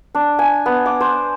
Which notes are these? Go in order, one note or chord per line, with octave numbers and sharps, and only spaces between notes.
D4
G#5
B3
D6
C5